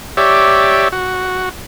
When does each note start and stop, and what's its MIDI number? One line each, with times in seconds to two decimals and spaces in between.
0.17 0.88 67
0.17 0.88 73
0.17 0.88 74
0.17 0.88 76
0.92 1.49 66